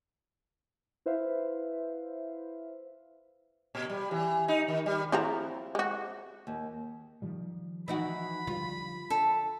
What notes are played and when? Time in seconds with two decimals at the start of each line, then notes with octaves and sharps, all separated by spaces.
1.06 E4 B4 C5 E5 F5
3.75 A#2
3.90 G3
4.11 E3
4.48 D#4
4.68 D#3
4.86 G3
5.12 F3 C4 E4 G#4 A#5
5.75 G#3 F#4
6.47 D#2
7.22 D#3 F3 G3
7.88 E3 D#4 F#4 B5
8.47 D3 F3 G3 F4
9.10 D4 A4